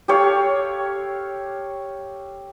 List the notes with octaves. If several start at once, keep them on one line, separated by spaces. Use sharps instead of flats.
G4 A4 C#5 F5